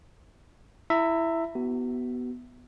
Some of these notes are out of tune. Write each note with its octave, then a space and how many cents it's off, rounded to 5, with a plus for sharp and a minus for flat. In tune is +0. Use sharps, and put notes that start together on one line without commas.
E4 +5 E5 +5 A#5 -30
B3 +0 F#4 +35